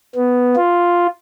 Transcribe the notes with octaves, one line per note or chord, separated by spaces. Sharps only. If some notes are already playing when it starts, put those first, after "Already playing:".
B3
F4